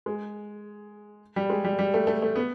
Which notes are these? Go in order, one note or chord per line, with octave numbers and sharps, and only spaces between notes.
G#3
G3
G#3
G3
G3
A3
A3
A3
B3